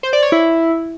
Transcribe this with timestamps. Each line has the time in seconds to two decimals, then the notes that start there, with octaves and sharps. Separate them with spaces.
0.03 C5
0.13 D5
0.23 C#5
0.32 E4